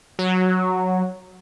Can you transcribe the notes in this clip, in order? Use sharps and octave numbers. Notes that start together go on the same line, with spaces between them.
F#3